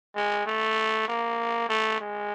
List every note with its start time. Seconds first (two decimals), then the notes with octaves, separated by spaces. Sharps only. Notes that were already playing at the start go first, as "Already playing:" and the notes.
0.15 G#3
0.46 A3
1.08 A#3
1.69 A3
2.01 G#3